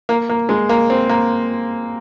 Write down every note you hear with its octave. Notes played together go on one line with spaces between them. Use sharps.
A#3
A#3
G#3
A#3
C4
A#3